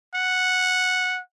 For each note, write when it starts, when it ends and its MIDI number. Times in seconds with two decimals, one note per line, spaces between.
0.15 1.20 78